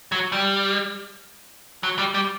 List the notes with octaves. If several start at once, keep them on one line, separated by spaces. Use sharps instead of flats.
F#3
G3
F#3
G3
G3